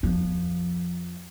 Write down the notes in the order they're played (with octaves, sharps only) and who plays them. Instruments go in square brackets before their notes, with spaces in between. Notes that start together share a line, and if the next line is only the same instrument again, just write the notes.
[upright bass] F2 F3